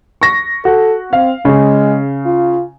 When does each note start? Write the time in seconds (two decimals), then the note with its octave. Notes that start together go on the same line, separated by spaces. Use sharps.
0.21 C#6 A#6
0.65 F#4 A4
1.13 C4 F5
1.45 C#3 G#3
2.26 F4